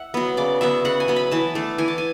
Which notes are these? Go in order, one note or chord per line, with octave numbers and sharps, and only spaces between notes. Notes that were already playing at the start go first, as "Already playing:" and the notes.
Already playing: E5 F#5
F#3 B3
C#3 D5
F#3 B3 E5
C#3 F#5
G#5
F#3 B3
B5
E3 A5
A3 D4
E3 G#5
A5
G#5